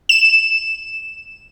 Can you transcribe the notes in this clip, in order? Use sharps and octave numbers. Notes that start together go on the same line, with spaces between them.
E7